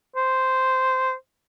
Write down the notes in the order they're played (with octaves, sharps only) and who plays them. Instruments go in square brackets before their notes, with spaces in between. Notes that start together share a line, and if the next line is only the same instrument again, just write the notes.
[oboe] C5